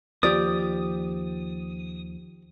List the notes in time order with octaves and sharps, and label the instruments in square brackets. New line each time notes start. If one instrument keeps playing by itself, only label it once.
[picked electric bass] D#2 F3 [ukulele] G4 D5 [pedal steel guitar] D#6